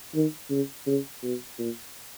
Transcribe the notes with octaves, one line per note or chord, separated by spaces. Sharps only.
D#3
C#3
C#3
B2
A#2